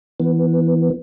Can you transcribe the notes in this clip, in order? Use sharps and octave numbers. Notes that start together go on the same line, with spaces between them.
E3 B3